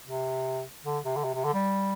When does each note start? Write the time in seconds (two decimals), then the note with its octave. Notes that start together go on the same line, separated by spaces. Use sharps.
0.08 C3
0.85 D3
1.05 C3
1.17 D3
1.24 C3
1.35 C3
1.44 D3
1.54 G3